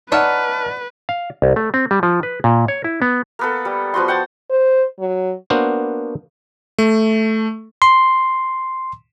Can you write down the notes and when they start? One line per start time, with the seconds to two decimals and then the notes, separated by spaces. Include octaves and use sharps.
0.12 D#4 B4 C#5 D5 E5 F#5 A5 F6
1.09 F5
1.42 C2
1.56 A3
1.74 C4
1.91 G3
2.03 F3
2.23 B4
2.44 A#2
2.68 C#5
2.84 E4
3.02 B3
3.39 A#3 B3 A4
3.65 G3
3.94 F3 B3 F#4 C6
4.08 F#5 G5 A5
4.50 C5
5.00 F#3
5.50 A#3 B3 D4 F#4 A#4 C5
6.78 A3
7.82 C6